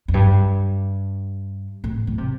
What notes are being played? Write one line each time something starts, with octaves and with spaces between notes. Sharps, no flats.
F2
G2
A2
E3
C3